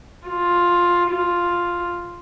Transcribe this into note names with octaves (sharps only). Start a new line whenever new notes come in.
F4
F4